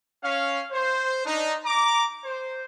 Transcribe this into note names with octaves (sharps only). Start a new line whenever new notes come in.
C#4 F5
C5
D4 D#4
A#5 D6
C5